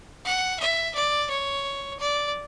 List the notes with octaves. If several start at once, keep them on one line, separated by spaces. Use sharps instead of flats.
F#5
E5
D5
C#5
D5